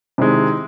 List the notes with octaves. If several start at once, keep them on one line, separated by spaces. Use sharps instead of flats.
C3 D#3 G#3 E4